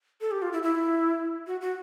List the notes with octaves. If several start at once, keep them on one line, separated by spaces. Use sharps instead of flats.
A4
G4
F4
E4
E4
F#4
F#4